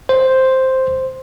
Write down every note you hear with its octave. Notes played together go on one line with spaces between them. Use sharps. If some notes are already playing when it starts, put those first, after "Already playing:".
C5